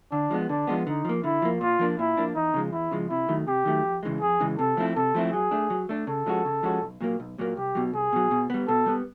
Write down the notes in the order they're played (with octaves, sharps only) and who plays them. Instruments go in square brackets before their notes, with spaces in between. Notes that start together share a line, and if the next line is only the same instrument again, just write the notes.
[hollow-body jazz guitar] D3 [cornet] D4
[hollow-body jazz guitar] F3 G#3 B3
[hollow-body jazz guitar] D3 [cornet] D4
[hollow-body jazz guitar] F3 G#3 B3
[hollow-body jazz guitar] D3 [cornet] D#4
[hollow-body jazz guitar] F3 A#3
[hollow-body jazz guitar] D3 [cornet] E4
[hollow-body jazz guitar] F3 A#3
[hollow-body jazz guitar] A#2 [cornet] F4
[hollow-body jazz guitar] F3 A#3 D4
[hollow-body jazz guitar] A#2 [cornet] E4
[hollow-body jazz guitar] F3 A#3 D4
[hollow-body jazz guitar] E2 [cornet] D#4
[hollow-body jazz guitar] C#3 F3 G#3
[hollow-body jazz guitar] E2 [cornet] E4
[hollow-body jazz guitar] C#3 F3 G#3
[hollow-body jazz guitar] C3 [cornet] E4
[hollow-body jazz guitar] D#3 F#3 A3
[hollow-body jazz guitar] C3 [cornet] G4
[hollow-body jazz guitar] D#3 F#3 A3
F2
C#3 E3 G#3
[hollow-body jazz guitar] F2 [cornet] G#4
[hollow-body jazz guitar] C#3 E3 G#3
[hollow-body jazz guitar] C3 [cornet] A4
[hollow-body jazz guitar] F3 A3 C4 E4
[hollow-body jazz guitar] C3 [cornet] A4
[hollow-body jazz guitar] F3 A3 C4 E4
[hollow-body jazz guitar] F#3 [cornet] G#4
[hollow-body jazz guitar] A3 D4
F#3
A3 D4
[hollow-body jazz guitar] C#3 [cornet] A4
[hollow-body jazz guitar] F3 G#3 C#4 F#4
C#3
F3 G#3 C#4 F#4
B1
A#2 F#3 A#3
B1
A#2 F#3 A#3
[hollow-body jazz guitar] C2 [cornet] G4
[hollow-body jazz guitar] B2 F#3
[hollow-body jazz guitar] C2 [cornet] G#4
[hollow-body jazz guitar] B2 F#3
B2
G3 B3
[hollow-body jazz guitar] B2 [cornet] A4
[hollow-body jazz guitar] G3 B3